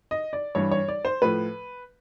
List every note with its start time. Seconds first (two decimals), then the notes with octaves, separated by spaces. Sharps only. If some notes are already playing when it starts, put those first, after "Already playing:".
0.11 D#5
0.33 D5
0.55 G2 E3 G3 C#5
0.71 C#5
0.88 D5
1.05 C5
1.22 A2 F3 B4